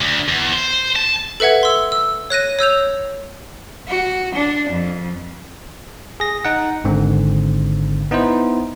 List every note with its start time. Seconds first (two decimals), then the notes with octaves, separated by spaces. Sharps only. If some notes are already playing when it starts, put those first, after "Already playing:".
0.01 D2
0.28 E2
0.53 C5
0.96 A5
1.40 A4 B4 E5 F#5 G#6
1.63 C6 E6
1.92 E6
2.30 C#5 F#6 A#6 D#7
2.59 C#5 E6 G6 F7
3.88 F#4
4.35 D4
4.69 F2
6.20 G#4 A#6
6.45 D#4 F#5
6.84 G#1 G#2 D3 C4
8.11 B3 D#4 E4 C5